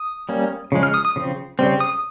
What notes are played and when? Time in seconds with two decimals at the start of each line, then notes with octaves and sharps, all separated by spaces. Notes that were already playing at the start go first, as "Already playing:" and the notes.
Already playing: D#6
0.29 G3 A#3 C#4
0.72 C#3 F3 G#3
0.83 F6
0.94 D#6
1.05 D#6
1.16 C#3 F3 C4
1.59 C#3 G3 C4
1.80 D#6